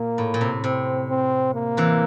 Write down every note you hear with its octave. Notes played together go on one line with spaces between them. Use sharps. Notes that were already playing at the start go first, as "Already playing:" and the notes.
Already playing: A#2 A#3
A2
A#2
C3
C3 C4
C4
A#3
C3 E3